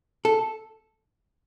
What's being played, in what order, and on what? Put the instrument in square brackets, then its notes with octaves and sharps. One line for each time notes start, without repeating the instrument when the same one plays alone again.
[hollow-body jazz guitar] A4